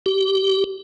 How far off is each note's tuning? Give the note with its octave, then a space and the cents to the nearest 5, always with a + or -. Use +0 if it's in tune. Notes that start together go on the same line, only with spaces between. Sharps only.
G4 -25